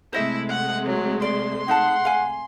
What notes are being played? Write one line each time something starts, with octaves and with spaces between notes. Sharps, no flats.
C3 G#3 A3 E4 C5 D#5 E5
F#5
F#3
D5 C6
D#4 F5 F#5 A5
F5 G#5